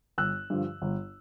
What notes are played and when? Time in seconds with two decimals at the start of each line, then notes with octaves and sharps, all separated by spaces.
0.18 G1 E6 F#6
0.50 G2 D3 F3
0.82 G1